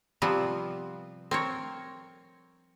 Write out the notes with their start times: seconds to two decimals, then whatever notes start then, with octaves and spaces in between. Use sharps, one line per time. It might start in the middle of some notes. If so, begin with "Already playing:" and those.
0.22 C3 F3 G3 B3 C4
1.31 C4 A#4 C#5